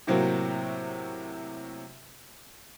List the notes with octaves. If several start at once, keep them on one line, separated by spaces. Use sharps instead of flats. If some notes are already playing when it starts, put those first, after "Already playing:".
A2 C3 F#3 A#3 C4 F#4